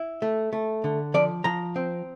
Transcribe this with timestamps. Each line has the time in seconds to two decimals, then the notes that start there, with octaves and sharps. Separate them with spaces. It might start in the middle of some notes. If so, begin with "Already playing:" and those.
Already playing: E4
0.22 A3
0.53 A3
0.84 D3
1.14 F3 D5
1.44 F3 A#5
1.76 C4